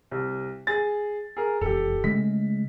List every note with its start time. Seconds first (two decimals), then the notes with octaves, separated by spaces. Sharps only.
0.11 C2
0.67 G#4 A6
1.37 G#4 A#4
1.61 E1 F2 G4 A4
2.04 C#3 G#3 A3 B6